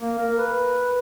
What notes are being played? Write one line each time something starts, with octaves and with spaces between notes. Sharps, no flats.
A#3
A#4
B4